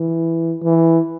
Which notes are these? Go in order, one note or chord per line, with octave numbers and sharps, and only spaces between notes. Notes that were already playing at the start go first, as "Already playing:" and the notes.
Already playing: E3
E3